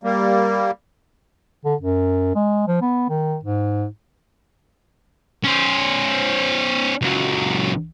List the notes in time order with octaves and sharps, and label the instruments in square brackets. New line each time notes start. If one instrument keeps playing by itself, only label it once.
[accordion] G3 A#3
[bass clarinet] D3
F#2
G#3
F3
B3
D#3
G#2
[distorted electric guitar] C#4 C5
C#2 F#3